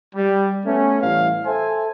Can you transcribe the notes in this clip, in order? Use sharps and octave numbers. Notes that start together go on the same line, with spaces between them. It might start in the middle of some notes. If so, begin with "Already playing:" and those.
G3
A3 B3 C#4
A2 E3 G3 F5
A4 C5 E5 G#5